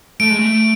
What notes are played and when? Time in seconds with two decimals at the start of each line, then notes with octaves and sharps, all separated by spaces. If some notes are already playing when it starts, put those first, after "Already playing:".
0.20 A3 D7
0.30 G#3
0.39 A3